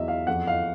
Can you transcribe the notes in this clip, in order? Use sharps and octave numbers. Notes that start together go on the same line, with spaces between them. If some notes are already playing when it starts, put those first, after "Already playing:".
Already playing: E2 F#3 D#5 E5
F5
F2 F#5
F5